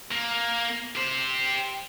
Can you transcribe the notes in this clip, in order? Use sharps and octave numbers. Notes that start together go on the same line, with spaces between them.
A#3
G4 C5